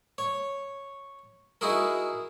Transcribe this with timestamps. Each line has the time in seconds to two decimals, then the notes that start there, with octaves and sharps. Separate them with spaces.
0.18 C#5
1.61 D#4 E4 F#4 G#4 A#4